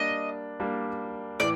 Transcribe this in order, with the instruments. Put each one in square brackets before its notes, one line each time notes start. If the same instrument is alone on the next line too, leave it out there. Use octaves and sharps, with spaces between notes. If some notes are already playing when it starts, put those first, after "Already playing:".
Already playing: [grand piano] G3 A#3 D4 [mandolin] D#5
[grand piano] G3 A#3 D4
[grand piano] A2 E3 [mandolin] D5